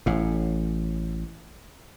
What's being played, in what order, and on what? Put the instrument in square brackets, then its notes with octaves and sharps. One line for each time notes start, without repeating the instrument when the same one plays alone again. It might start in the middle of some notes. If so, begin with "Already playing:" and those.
[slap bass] A1 A2